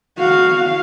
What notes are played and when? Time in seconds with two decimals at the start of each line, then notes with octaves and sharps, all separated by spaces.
0.18 F#4 F5